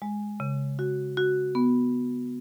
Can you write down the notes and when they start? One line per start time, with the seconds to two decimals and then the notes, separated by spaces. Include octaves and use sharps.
0.02 G#3
0.40 C#3
0.79 F#4
1.17 F#4
1.55 B3